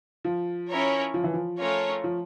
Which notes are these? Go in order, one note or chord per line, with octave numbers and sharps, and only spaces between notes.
F3
C#4 E4 A#4 C#5
F3
E3
F3
A3 C#4 F4 A#4 C#5
F3